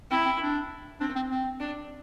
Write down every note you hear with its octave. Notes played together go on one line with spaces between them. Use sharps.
C4 E4
C4
D4
C4 D4
C4
C4
D4